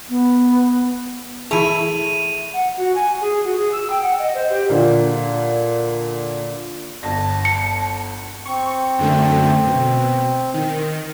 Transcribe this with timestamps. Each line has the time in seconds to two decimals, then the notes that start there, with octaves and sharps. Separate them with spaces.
0.09 B3
1.51 E3 A3 E4 G#4 D#7 F7
2.54 F#5
2.77 F#4
2.95 G#5
3.21 G#4
3.44 F#4
3.56 G#4
3.72 E6
3.90 G5
4.02 F#5
4.19 D#5
4.35 C5
4.50 G4
4.70 A#2 D3
7.03 G1 A5 A#6
7.45 C#7
8.45 C4 C#6
8.99 F#2 D3 A3
9.66 B2
10.54 D#3